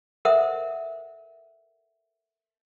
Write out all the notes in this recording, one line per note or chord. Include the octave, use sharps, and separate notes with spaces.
A4 A#4 C5 E5 F#5